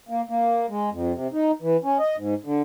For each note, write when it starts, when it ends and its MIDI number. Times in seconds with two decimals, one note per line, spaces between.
0.09 0.21 58
0.29 0.66 58
0.69 0.90 56
0.92 1.12 41
1.14 1.28 48
1.33 1.51 63
1.62 1.77 52
1.84 1.98 61
1.99 2.16 75
2.17 2.34 44
2.45 2.62 50